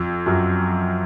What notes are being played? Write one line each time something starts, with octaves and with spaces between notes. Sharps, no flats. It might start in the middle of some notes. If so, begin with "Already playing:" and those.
Already playing: F2
F#2